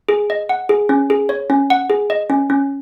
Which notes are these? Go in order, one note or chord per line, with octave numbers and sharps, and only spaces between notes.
G#4
D#5
F#5
G#4
C#4
G#4
C#5
C#4
F#5
G#4
D#5
C#4
C#4